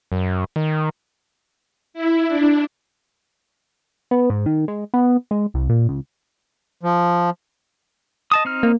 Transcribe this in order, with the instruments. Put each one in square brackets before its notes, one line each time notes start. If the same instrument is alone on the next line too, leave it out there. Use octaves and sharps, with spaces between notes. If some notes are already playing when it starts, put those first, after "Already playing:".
[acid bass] F#2
D#3
[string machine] E4
D4
[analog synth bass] B3
G#2
D#3
G#3
B3
G#3
C2
A#2
C#2
[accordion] F3
[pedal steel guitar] D#5 A5 D#6
C4 D#4 F6
[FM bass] A#3